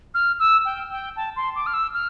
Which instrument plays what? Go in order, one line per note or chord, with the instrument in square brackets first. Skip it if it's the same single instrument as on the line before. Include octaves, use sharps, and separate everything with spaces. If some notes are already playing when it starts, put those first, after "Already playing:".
[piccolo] F6
E6
G5
G5
A5
C6
D6
F6
E6
F6